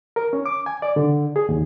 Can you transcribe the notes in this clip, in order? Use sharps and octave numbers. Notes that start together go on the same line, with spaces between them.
A#4
C#4
D6
G#5
D5
D3
G#4
D#2